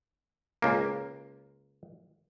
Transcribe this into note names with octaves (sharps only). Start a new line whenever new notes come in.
C#2 A#3